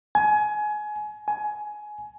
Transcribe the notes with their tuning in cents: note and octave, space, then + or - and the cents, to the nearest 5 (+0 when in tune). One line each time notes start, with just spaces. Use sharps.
G#5 +25
G#5 +20